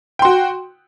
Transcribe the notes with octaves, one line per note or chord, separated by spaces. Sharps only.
F#4 G5 C6